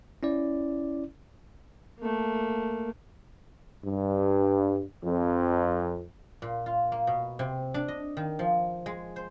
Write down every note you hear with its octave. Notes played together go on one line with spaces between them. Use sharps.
C#4 E4 D5
A3 A#3
G2
F2
A#2
F4
A#3
B2
C3
D4
D#5
D#3
F3
G#3
C5